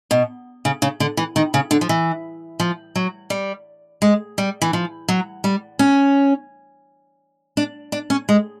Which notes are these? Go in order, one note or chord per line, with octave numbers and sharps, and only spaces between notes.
B2
C#3
C#3
D3
E3
D#3
C#3
D3
F3
E3
F3
F#3
G3
G#3
G3
E3
F3
F#3
G3
C#4
D4
D4
C#4
G#3